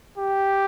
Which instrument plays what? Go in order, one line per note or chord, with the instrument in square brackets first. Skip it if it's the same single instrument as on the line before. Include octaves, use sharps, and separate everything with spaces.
[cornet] G4